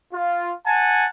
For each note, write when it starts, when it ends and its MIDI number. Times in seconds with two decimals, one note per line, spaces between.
0.12 0.51 65
0.65 1.06 78
0.65 1.06 80
0.65 1.06 81